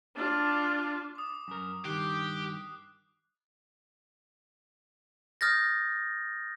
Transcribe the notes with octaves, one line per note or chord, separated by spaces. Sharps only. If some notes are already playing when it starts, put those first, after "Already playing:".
D4 F4
D6 D#6
F#2 A#4
G2 D#3 G4 F#6 C7
D#6 F6 G6 A6 A#6